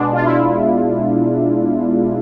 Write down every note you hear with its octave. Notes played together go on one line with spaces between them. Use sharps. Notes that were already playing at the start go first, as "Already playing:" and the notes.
Already playing: B2 G#3 D4
F4
E4